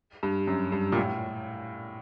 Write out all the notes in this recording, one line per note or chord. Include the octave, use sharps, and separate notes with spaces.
G2
F#2
G2
A#2
A2